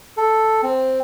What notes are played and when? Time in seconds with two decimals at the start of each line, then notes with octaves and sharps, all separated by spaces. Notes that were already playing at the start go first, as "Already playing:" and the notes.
0.17 A4
0.63 C4